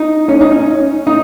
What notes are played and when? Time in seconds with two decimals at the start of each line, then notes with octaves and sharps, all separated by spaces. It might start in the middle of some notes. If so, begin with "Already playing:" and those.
Already playing: D#4
0.29 C#4
0.41 D#4
0.52 C#4
1.07 D#4